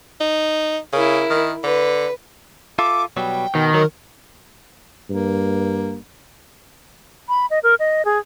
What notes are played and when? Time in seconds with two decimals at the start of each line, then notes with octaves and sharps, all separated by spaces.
0.21 D#4
0.93 C#3 E4 A#4
1.30 D#3
1.64 D3 B4
2.79 F4 A4 E5 D6
3.17 B2 F#3 G3 G5
3.55 B2 D#3
3.74 F#3 A#4
5.09 G2 A#3
7.29 B5
7.50 D#5
7.63 A#4
7.79 D#5
8.05 G#4